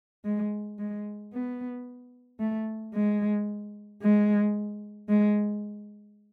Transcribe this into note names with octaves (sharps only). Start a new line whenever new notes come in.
G#3
G#3
B3
A3
G#3
G#3
G#3